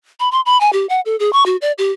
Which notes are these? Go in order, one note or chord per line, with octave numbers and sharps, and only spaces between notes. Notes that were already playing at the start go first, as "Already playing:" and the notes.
B5
C6
B5
G#5
G4
F#5
A4
G#4
C#6
F#4
D5
G4